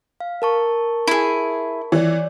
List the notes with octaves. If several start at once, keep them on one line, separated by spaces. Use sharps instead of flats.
F5
A#4 A5 C#6
E4 G#4
E3 C#5 D5